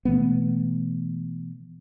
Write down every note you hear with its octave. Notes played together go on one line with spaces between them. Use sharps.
B2 E3 A3 B3